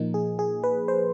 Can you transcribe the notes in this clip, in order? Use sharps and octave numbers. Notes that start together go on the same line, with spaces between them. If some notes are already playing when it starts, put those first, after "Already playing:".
Already playing: A#2 F3 A#3 D#4
G#4
G#4
B4
C5